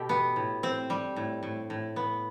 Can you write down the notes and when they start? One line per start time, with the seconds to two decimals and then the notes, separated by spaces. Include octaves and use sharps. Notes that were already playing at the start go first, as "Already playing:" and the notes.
Already playing: B2 G4 A4
0.09 B3
0.36 A2
0.63 C4
0.90 G3
1.16 A2
1.43 A2
1.70 A2
1.96 B3